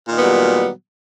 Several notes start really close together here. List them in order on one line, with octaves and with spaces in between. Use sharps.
A#2 D#3 B3 G3 F#3